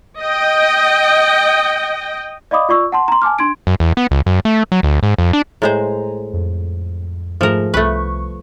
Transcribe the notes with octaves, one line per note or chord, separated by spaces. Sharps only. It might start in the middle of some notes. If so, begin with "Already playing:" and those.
D#5 G5
D5 D#5 F5 B5 D6 D#6
F4 D5 C#6 E6
F#5 A5 C6
A#5 C6
G#5 A5 D6 F6
D4 C6 G#6 D7
F#2
E2
B3
C#2
F#2
A3
F#3
D2
G#2
F2
D4
A2 G#3 C5 G#5 A#5
F2
G#2 F3 A3 G#4 A#4
C2 A3 B4 C#6